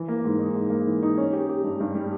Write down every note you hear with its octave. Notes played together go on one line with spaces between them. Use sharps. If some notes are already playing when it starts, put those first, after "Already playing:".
Already playing: E3
A#3
G#2
D#4
G#2
A#3
E3
D#4
C#4
G4
G4
G2
G2
G3